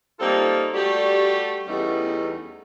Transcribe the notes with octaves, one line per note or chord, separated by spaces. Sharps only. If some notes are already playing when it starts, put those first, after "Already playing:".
G3 A#3 C4 D#4 F4 A4
G3 A3 F#4 G4 D5
E2 G3 A3 B3 C#4 D#4